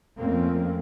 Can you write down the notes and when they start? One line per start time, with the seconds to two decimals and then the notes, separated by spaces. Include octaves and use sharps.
0.17 F2 F3 A3 A#3 C4 C#4